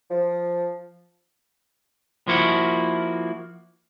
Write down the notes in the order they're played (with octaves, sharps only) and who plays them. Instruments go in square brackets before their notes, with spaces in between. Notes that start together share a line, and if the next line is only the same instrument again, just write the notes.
[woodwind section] F3
[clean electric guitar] F3 A#3 E4 F#4